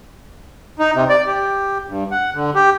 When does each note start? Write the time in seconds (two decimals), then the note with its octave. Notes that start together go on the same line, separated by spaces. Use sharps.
0.79 D#4
0.95 C3
1.09 D5
1.27 G4
1.88 G2
2.11 F#5
2.34 D3
2.55 G4